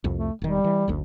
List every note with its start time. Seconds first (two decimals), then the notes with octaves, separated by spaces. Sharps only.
0.04 C2 F2
0.17 A3
0.42 E1 D#3 G3
0.64 E3
0.88 F#1 D2